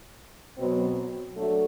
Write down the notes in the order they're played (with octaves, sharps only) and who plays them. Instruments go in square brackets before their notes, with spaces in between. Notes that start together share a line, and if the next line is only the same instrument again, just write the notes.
[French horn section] B2 F#3 C4
F#3 A3 D4 F#4 A4